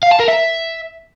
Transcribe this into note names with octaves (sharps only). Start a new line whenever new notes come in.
F5
A5
A#4
E5